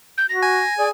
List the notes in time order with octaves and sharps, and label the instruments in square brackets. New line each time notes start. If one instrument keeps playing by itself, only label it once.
[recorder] G6
[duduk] F#4 [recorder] A#6
[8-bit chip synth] G#5
[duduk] G#4 [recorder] D5